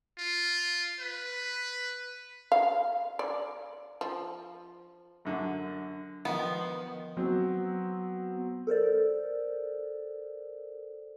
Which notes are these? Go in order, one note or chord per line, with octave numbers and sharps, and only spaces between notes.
F4
B4
F5
D5
F3
F#2 D3
D#3 F3 B3
F#3 B3 C4
A4 A#4 C5 D5